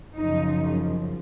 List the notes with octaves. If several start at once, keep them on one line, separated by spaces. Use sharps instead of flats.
F#2 C#3 F3 D#4